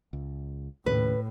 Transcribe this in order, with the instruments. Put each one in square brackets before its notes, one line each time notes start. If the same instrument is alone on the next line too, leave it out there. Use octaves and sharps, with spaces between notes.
[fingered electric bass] C#2
[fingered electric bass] D#2 C#3 [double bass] A2 [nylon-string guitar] B4